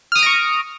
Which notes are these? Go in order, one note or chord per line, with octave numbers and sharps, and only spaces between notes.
C#6 D#6 F6 A#6 D7